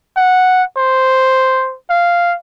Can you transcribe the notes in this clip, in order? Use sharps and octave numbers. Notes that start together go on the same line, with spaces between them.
F#5
C5
F5